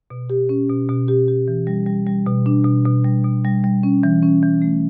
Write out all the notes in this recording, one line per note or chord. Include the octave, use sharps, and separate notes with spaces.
B2
G4
C#4
B2
B2
G4
G4
E3
G3
G3
G3
B2
D4
B2
B2
G3
B2
G3
G3
C#4
E3
C#4
E3
A3